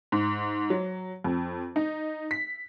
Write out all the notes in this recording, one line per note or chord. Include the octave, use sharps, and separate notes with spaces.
G#2
F#3
F2
D#4
B6